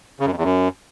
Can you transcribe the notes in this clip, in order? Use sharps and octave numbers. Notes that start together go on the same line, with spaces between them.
C#3
F#2
F2
E2
F#2